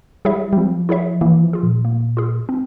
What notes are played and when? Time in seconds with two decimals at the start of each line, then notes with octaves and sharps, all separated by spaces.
0.25 G3 E4 G#4 C#5 E5
0.53 G3
0.57 F3 C4
0.89 E4 G#4 C#5 E5
1.21 E3 A#3
1.43 F3
1.53 F4 G#4
1.63 A#2
1.85 A#3
2.17 F4 G#4
2.49 C4